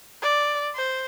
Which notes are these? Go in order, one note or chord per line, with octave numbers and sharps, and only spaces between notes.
D5
C5